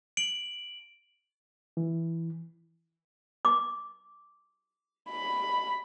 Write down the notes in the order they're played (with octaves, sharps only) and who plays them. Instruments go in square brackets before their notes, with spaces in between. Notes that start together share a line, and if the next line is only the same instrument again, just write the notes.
[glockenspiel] D7 F#7
[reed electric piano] E3
[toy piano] D6
[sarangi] B5